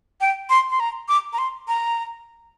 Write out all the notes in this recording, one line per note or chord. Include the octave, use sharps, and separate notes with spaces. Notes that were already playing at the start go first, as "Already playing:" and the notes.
G5
C6
C6
A#5
D6
A#5
C6
A#5